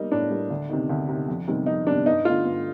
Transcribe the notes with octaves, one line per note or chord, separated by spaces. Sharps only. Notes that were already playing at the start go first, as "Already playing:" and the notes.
Already playing: G3 A#3 D#4
A2 D4
G3 A#3
D2
C3 D#3
D2
C3 D#3
F2
C3 D#3 G3
F2 D#4
C3 D#3 G3 D4
G2 D#4
D3 A3 F4
G2